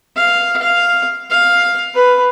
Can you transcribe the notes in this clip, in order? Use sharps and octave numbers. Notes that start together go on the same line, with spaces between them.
F5
F5
F5
B4